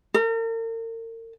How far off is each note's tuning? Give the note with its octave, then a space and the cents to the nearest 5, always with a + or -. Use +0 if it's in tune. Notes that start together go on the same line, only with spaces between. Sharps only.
A#4 -40